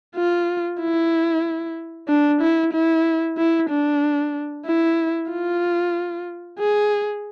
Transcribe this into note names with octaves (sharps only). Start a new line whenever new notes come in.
F4
E4
D4
E4
E4
E4
D4
E4
F4
G#4